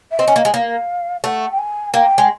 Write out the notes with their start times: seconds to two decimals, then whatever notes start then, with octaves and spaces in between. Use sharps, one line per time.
0.11 E5
0.18 C4 D#5
0.28 C#4
0.36 A#3
0.45 G#3
0.54 A#3 F5
1.24 A3 F#5
1.51 G5
1.58 G#5
1.93 A#3 G5
2.18 G#3